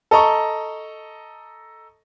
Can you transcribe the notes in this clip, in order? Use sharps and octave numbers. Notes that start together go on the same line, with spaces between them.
A4 D#5 A#5 C#6